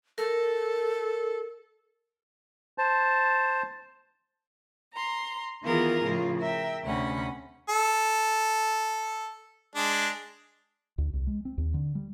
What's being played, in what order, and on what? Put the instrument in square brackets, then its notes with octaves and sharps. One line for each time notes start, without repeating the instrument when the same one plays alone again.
[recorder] A4 [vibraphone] A#4
[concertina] C5 A5
[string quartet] A#5 C6
D#3 E3 B3 F4 G#4 A#4
A2 C#3 F3 F4
A#4 E5 G5
D2 C3 C#4 F#5 B5
[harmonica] A4
G#3 D4
[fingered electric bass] D2
C2
G#3
C4
D#2
D3
G3